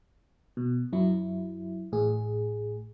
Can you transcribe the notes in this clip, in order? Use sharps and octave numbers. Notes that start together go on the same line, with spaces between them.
B2
F#2 F#3 E4
A1 A2 G#4